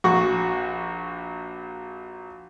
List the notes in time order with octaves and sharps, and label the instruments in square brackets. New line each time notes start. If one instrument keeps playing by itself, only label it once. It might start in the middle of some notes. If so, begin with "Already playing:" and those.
[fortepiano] A#1 F#4 C#6